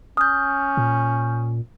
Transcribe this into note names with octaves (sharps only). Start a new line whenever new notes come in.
C#4 D#6 F6 G6
A#2